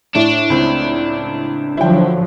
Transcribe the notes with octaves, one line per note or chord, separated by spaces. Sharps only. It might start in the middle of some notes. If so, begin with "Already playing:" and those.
A2 D4
C#2 C4
D3 F3 F#3 E4 G5